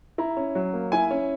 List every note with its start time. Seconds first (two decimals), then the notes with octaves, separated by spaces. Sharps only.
0.18 E4 A#5
0.37 C#4
0.55 F#3
0.73 A#3
0.92 E4 G#5
1.11 C#4